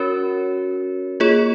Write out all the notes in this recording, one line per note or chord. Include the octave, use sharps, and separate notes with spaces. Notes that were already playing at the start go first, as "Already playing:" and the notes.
Already playing: C#4 F#4 A#4 C#5
A#3 F4 G#4 C#5